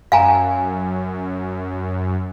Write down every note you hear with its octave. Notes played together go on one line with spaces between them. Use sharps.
F#2 F5 G#5 A#5